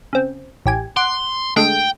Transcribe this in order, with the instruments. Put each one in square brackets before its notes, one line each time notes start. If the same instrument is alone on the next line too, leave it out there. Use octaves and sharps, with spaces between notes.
[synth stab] C#3 C4
A1 G4 G#5
[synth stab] F#5 D6 [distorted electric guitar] C6
[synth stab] D3 G#3 A3 [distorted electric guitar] G5